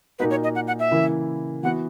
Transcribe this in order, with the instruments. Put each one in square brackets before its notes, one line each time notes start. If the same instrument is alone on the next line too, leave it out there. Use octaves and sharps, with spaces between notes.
[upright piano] A#2 A#3 D#4 F#4 [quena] B4
[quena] C#5
D#5
F#5
F#5
E5
[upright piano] C#3 E3 A#3 E4
[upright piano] E3 B3 F#4 [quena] F#5